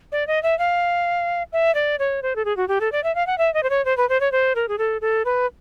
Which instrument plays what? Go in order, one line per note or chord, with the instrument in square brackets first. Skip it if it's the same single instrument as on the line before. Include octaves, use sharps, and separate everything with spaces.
[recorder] D5
D#5
E5
F5
E5
D5
C#5
C5
A4
G#4
F#4
G4
A4
D5
E5
F5
F#5
E5
D#5
C5
C#5
C5
B4
C5
C#5
C5
A#4
G#4
A4
A4
B4